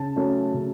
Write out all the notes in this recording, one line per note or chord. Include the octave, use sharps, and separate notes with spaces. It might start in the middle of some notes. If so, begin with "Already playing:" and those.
Already playing: C#3 A5
F#3 A3 C#4
C#3